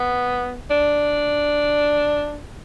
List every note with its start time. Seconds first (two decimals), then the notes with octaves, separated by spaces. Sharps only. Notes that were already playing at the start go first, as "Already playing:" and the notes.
Already playing: B3
0.70 D4